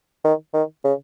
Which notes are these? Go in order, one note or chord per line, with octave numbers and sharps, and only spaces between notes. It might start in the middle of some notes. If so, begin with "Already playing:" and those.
D#3
D#3
C#3